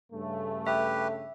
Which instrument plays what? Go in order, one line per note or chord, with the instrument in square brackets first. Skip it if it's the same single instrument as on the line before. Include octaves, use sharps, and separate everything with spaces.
[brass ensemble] G2 C#3 A3
[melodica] G4 B4 [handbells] E5